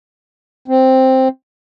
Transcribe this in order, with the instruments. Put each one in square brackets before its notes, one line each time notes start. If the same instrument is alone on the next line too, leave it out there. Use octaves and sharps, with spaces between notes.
[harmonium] C4